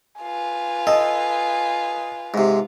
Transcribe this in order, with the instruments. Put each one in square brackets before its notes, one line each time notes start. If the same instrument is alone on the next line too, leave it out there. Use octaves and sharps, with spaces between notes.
[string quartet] F4 B4 [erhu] G#5
[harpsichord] A4 [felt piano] D#5
[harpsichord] G#2 C3